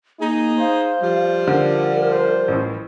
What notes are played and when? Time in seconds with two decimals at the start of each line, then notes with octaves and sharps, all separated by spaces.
0.20 A#3 D#4 G#4
0.59 C5 F5
1.01 F3 G3
1.48 D3 A#4
2.11 C5
2.48 A1 A2